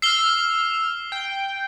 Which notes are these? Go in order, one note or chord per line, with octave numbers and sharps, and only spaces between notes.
E6 F6 C7 G7
G5